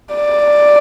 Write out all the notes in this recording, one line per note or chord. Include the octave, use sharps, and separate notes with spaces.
D5